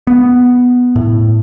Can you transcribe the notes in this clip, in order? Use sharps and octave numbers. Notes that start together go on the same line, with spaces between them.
B3
A2